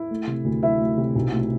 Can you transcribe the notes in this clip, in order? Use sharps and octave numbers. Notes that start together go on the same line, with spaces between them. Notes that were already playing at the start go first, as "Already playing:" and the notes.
Already playing: E4
A3
C3
D2
F#3 E4 E5
A3
C3
B1
A2